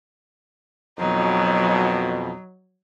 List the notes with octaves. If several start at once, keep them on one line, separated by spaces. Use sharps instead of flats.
F2 B2 F#3 D#4